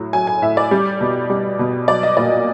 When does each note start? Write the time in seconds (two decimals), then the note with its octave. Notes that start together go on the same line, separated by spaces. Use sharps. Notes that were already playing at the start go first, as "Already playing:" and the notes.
Already playing: A2 F#3
0.13 F#3 G#5
0.27 G#5
0.42 A2 E5
0.57 D5
0.71 G3
1.01 B2
1.30 G3
1.59 B2
1.88 F#3 D5
2.03 D#5
2.17 A#2 D5